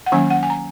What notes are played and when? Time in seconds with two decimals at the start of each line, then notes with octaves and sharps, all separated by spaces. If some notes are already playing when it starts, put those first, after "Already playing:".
0.06 F#5
0.12 D#3 F#3 A#3 C#4 G#5
0.30 F#5
0.43 G#5
0.50 A#5